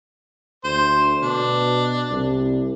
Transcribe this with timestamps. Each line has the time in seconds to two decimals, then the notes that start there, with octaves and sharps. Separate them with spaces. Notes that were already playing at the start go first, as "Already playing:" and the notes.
0.64 D2 C5
1.22 B2 D4
2.11 C2